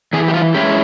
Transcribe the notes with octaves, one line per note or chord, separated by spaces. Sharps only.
E3 G#4
G4
F4
G#3 C#4 E4 G4